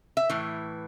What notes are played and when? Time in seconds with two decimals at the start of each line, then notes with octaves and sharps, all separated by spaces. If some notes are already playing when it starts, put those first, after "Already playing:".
0.17 E5
0.30 A2 E3